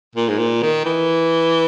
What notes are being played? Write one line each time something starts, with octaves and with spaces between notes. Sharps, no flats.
A#2
G#2
A#2
D#3
E3